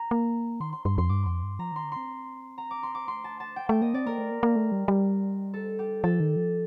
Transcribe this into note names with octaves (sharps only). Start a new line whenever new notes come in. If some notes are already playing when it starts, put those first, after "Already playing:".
Already playing: A#5
A#3
D#3 C6
C6
G2 C6
F2 C6
G2 D6
F2 C6
G2
F3 A#5
D#3 C6
D3
C4 C6
A#5
D6
C6
D6
A3 C6
A5
A5
G5
A3 G5
A#3 D#5
C4 D5
A#3 A#4
A3
A#3
A#3
A3
G3
G3
A4
G4
F3 A4
D#3
F3